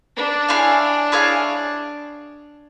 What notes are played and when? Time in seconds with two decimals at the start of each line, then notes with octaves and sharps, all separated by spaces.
0.17 D4
0.49 E4 G#4 C#5 F5
1.12 E4 G#4 C#5 F5